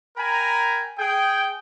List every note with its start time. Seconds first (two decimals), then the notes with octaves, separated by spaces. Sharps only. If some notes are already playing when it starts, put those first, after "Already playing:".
0.17 A#4 G5 G#5 A#5 B5
0.99 G#4 G5